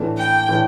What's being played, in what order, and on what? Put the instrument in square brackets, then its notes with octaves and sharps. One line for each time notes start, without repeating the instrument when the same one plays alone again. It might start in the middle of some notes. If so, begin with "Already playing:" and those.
Already playing: [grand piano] A2 E3 A3 D4
[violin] G5
[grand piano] A2 E3 A3 D4